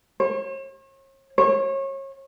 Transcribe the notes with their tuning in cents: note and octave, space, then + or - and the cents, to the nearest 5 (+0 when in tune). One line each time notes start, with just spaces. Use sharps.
C#5 -45
C#5 -30